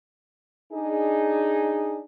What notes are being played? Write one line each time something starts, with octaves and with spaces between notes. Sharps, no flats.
D4 D#4 G#4